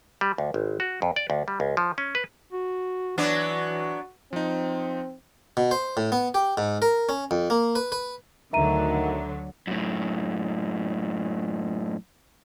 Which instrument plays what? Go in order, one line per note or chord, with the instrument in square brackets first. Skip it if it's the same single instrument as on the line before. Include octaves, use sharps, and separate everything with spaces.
[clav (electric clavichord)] G3
D2
G#1
F#4
F2
D5
D2
G3
C#2
F3
C#4
B4
[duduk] F#4
[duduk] E3 [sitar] F#3 B3 D4 [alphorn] F#4
[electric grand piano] F3 D#4 [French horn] C4
[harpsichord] B2
C5
A2
B3
G4
G#2
A#4
C#4
F2
A#3
B4
B4
[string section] D2 D3 F#3 [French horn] D#3 [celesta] E5 A#5 D#7
[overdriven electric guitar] F#2 A2